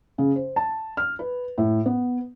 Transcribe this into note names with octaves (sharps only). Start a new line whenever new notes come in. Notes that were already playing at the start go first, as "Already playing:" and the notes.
C#3
C5
A5
F6
B4
A2
B3